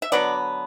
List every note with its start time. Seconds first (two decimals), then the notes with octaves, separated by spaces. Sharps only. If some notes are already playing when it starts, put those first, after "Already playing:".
0.02 E5
0.12 D3 F#3 B3 D5